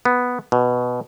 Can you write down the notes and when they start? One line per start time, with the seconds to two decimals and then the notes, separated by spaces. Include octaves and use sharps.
0.05 B3
0.52 B2